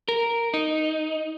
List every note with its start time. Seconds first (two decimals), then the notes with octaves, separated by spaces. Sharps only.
0.08 A#4
0.54 D#4